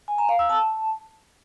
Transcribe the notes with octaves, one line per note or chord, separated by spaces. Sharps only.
G#5
A#5
F5
E6
A5